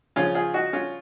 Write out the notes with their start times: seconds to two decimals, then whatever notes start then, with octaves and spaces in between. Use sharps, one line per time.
0.16 C#3 F3 C#4 F4
0.35 F4 G#4
0.54 D#4 F#4
0.73 C#4 F4